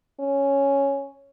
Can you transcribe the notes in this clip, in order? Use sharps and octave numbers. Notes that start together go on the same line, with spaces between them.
C#4